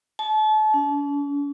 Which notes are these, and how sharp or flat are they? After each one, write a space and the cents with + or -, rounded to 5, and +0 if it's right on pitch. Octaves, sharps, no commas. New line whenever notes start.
A5 -35
C#4 +45